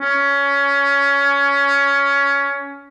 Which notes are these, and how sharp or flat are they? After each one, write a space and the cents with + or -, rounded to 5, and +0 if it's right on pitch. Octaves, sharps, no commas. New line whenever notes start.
C#4 +15